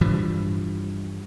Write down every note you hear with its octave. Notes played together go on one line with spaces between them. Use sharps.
G2 E3 F3 G3